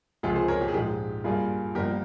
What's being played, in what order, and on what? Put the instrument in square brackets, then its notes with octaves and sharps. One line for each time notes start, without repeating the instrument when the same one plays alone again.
[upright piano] C#2 C3 F3 F4 G#4
G#4 C5
A#4 C#5
G4
G#4
A#1 G#2 F3 G#3 G4
G2 G3 A#3 F4 G#4
G1 G2 F3 A#3 G4 A#4